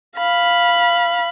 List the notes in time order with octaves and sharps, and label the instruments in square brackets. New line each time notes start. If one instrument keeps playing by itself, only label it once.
[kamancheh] F5 B5